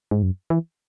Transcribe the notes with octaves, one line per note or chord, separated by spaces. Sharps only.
G#2
F#2
E3